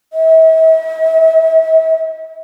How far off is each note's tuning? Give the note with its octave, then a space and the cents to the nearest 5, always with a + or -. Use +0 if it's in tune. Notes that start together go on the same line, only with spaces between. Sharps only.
E5 -45